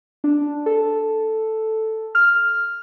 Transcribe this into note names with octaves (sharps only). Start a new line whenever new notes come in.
D4
A4
F6